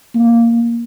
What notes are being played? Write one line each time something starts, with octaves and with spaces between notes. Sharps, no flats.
A#3